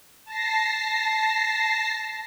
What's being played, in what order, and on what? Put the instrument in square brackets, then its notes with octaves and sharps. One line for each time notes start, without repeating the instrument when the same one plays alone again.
[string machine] A5 A#6 C7